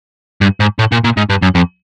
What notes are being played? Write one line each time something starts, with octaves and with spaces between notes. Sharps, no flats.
G2
G#2
A2
A#2
A#2
G#2
G2
F#2
F2